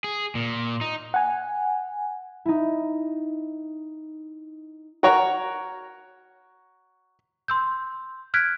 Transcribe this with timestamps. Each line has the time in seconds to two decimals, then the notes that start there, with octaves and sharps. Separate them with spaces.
0.04 G#4
0.35 A#2
0.81 D#4
1.14 F#5 G#5
2.45 D#4 E4
5.03 F#4 A#4 C#5
7.48 C6 E6 G6
8.34 F6 F#6 G#6 B6 D7